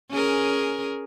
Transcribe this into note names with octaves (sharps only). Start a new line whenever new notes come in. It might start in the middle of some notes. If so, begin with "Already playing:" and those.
C#4 G#4 A#4